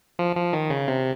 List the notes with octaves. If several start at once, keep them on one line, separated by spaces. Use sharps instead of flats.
F3
F3
D#3
C#3
C3